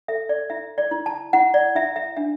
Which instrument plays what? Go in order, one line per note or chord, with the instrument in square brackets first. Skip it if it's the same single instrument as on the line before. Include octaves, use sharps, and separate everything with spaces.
[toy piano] A4 E5
D5
E4 E5
D5
E4
A5
E4 F#5
D5
E4 E5
E5
D4 E5